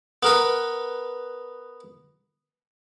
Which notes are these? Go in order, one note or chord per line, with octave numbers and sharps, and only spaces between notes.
B3 A#4 B4